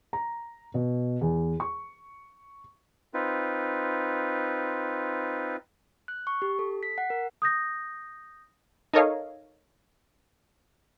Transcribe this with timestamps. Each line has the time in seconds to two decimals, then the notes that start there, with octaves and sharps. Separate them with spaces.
0.13 A#5
0.74 B2
1.21 E2
1.60 C#6
3.14 C4 D#4 F4 B4
6.08 F#6
6.27 C#6
6.42 G4
6.59 A4
6.83 B6
6.98 F#5
7.10 A#4
7.42 D#6 G6 A#6
8.93 D#4 A4 A#4 C#5 D#5 F5